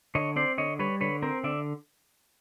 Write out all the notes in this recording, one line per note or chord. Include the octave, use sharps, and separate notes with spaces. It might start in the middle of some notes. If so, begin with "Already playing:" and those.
D3 C#5 D#5
C4 C5 D5
D3 C#5 D#5
G3 B4 C#5
D3 B4 C#5
C4 A#4 C5
D3 D5 E5